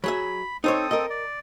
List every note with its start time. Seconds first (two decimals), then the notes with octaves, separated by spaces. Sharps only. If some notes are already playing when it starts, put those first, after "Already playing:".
0.04 F#3 G#4 E5 B5
0.64 C4 D#4 A4 C5 C#5 D#6
0.91 A#4 D#5
1.10 D5